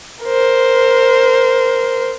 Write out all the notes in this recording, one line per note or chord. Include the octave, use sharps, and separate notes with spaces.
A#4 C5